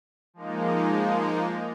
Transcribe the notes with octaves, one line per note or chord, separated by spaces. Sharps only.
F3 G#3 A#3 D#4